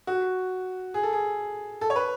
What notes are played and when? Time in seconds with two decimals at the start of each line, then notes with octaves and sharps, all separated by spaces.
0.07 F#4
0.94 G#4
1.03 A4
1.13 G#4
1.81 A4
1.90 C#5
1.96 B4